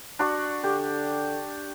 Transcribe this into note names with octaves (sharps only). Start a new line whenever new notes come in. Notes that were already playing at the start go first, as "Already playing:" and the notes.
D4 F#4 C#6
D3 G4